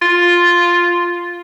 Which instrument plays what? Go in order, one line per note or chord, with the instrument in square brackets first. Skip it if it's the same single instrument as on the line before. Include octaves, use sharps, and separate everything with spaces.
[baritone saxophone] F4